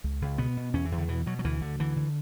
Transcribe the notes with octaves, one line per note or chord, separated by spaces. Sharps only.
C#2
C#2
B2 B3
B2
E2 C#4
E3
E2
D3
B2 E3
B2 F#3
F#3
D2 E3
D2 D3
D3 E3
D3